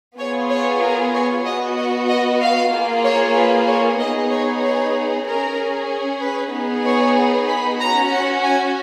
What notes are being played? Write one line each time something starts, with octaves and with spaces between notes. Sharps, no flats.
B3 F4 G#4 C#5
C#5
A#4
C#5
B3 F#4 D#5
D#5
D#5
F5
A#3 F4 G#4
C#5
B4
C#5
B3 D#4 G#4 D#5
C#5
C#5
C#4 G#4 A#4
B4
B3 D#4 G#4
C#5
B5
C#4 F#4 A#5
F#5
G#5